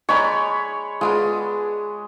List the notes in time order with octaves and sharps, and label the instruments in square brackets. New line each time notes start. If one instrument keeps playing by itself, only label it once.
[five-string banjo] G#3 D#4 D5 [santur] C#5 B5
[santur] G#3 [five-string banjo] B3 D4 F4